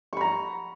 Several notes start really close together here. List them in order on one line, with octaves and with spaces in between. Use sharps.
C#6 B5 A#5